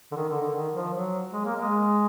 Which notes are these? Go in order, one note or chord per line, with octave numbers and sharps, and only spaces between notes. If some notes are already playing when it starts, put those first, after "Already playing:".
D3
D#3
D3
D3
D#3
F3
F#3
G#3
A#3
G#3